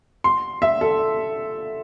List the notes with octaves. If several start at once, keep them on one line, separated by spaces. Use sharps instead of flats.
C6
E5
A4